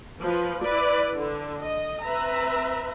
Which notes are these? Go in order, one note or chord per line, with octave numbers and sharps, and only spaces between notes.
F3 B4
E4 B4 D5
D3
D#5
C4 B4 E5 A#5